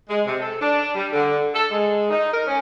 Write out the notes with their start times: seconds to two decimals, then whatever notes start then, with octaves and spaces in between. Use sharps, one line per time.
0.09 G#3
0.26 C3
0.40 A4
0.60 D4
0.95 G3
1.12 D3
1.55 A4
1.72 G#3
2.11 D#4
2.33 A#4
2.47 C#4